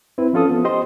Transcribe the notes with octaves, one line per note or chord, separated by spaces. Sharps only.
C4 E4 B4
F3 C#4 F4 A4 D#6
B3
G4 C5 D#5 C6